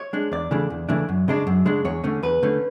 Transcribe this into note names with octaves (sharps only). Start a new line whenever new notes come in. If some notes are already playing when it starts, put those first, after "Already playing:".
Already playing: C#5
G#3 D4
E2 D5
C#3 E3 A3 D4
E2
C#3 E3 A3 D4
F#2
C#3 G#3 D4
F#2
C#3 G#3 D4
E2 C#5
D3 A3 C#4
E2 B4
D3 A3 C#4